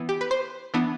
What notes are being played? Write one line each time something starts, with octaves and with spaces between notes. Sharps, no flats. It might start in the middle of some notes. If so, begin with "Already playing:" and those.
Already playing: E3 B3
G4
B4
C5
E3 B3 D4